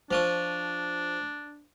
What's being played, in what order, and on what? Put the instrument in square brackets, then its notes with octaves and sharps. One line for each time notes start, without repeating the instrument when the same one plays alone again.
[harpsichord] F3 F4 C#5 [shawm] D4